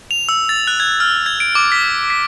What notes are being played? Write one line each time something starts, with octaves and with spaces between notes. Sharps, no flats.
F7
E6
A6
F#6
G#6
F6
G#6
D7
D6
B6
B6